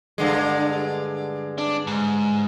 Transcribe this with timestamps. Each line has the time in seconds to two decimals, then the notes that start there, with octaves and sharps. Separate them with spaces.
0.18 G2 D3 G#3
1.58 D4
1.87 G#2